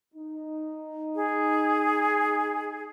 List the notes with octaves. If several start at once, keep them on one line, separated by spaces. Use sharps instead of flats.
D#4
G#4